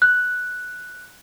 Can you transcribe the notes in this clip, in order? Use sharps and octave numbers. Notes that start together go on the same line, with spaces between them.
F#6